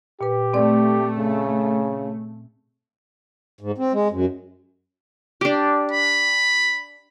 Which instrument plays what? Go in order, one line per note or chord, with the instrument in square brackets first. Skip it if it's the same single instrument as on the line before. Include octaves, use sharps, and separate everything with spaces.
[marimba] A#2 B4 [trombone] G4
[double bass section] A3 [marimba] C4 D5
[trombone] C#3
[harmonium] G#2
C4
G#3
F#2
[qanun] D4 G4
[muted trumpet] B5